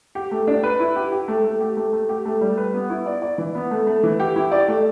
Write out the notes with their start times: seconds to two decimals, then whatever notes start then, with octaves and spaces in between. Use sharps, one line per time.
0.15 G4
0.31 A3
0.47 D4
0.63 B4
0.80 E4
0.96 G4
1.12 G4
1.28 A3
1.44 A3
1.60 G4
1.77 A3
1.93 A3
2.09 G4
2.25 A3
2.41 G3
2.57 B4
2.74 B3
2.90 E4
3.06 D5
3.22 D5
3.38 E3
3.55 B3
3.71 A3
3.87 A3
4.03 E3
4.20 G4
4.36 E4
4.52 D5
4.68 A3